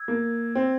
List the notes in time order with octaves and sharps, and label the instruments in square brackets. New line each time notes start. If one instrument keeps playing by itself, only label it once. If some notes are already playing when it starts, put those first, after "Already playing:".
Already playing: [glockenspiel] E6 G#6
[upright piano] A#3
C4